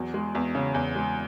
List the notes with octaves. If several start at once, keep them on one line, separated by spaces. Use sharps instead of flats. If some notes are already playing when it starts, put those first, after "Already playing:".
Already playing: E2 F#3
G#3
E2
C#3
E2
G#3